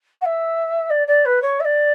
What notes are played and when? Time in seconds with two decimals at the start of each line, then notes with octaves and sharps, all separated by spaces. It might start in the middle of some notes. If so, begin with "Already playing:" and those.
0.21 F#5
0.25 E5
0.90 D5
1.07 D5
1.25 B4
1.42 C#5
1.60 E5
1.64 D5